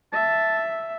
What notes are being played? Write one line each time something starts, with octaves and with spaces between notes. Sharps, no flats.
E5 A5